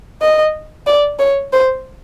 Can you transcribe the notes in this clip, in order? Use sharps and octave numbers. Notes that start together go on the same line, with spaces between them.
D#5
D5
C#5
C5